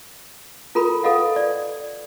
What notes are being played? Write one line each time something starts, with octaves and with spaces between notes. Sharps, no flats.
F4 A4 A#4 B5
A4 B4 D#5 F5 F#5
D5